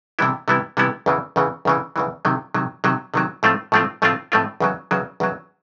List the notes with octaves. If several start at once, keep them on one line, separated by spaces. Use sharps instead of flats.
C3 E3 G3 B3 E4
C3 E3 G3 B3 E4
C3 E3 G3 B3 E4
E2 C#3 E3
E2 C#3 E3
E2 C#3 E3
E2 C#3 E3
C3 D#3 F#3
C3 D#3 F#3
C3 D#3 F#3
C3 D#3 F#3
A2 F3 A3 C4 F4
A2 F3 A3 C4 F4
A2 F3 A3 C4 F4
A2 F3 A3 C4 F4
E2 C#3 F#3
E2 C#3 F#3
E2 C#3 F#3